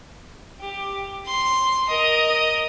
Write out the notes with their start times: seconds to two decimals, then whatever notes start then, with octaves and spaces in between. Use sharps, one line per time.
0.60 G4
1.26 C6
1.88 A#4 D#5